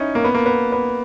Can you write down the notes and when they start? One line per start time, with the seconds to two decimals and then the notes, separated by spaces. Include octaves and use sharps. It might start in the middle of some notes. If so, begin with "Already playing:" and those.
Already playing: C#4 D#4 E4
0.15 A#3
0.24 B3
0.35 A#3
0.46 B3
0.72 B3